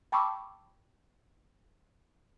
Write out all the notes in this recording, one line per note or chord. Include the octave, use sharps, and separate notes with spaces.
G5 A5 B5 C#6 D6 E6